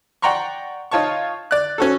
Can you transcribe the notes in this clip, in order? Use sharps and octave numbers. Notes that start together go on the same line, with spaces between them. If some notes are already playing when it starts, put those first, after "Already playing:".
D5 F#5 G5 A#5 C6 C#6
D#4 F4 C#5 A5 C#6
D5 F#6
C#4 F#4 A4